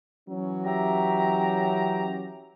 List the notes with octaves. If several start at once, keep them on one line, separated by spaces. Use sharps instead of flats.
E3 F#3 C#4
G4 E5 A#5